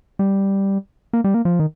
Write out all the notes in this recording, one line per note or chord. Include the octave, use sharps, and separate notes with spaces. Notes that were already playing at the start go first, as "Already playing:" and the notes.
G3
A#3
G3
A#3
F3
D#3